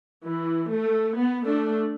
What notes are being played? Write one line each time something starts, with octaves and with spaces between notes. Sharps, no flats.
E3
A3
B3
A3 D4